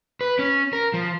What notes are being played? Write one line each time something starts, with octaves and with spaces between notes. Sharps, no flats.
B4
C#4
A#4
F3